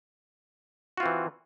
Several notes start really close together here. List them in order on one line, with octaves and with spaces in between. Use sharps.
F#4 F4 C4 E3